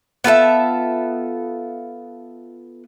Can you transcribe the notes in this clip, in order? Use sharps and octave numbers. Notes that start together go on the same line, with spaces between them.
B3 F4 A4 E5